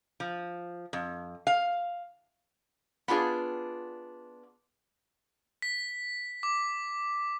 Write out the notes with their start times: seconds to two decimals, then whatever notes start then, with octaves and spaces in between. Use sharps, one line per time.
0.20 F3
0.93 F2
1.47 F5
3.08 B3 D4 F4 G#4 D5
5.62 B6
6.43 D6